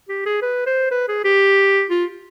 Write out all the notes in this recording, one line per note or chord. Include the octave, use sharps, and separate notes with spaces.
G4
G#4
B4
C5
B4
G#4
G4
F4